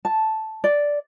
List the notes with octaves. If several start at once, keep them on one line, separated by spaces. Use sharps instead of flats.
A5
D5